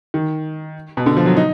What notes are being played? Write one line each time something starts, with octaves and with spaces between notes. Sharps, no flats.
D#3
B2
D3
F3
F#3
D#4